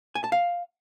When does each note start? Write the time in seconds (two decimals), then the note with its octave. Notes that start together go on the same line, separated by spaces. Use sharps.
0.15 G#5
0.24 A5
0.32 F5